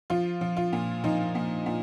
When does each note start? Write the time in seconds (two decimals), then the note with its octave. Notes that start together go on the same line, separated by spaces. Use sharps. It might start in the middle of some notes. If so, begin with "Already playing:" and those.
0.10 F3 F4
0.41 F3
0.57 F4
0.73 A#2
1.04 F3 D#4
1.35 A#2
1.66 A#2